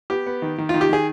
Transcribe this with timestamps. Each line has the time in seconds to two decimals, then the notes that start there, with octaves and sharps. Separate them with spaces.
0.10 B3 G4
0.27 B3
0.42 D#3
0.58 D#3
0.69 D#3 F4
0.81 G4
0.89 D#3 G#4